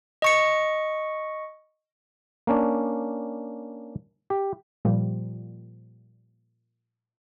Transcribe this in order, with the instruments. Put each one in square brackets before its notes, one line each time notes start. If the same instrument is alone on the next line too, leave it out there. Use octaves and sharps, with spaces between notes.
[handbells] D#5 C#6 C#7
[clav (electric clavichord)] A#3 C#4 D4
G4
[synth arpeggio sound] A#2 F3 G3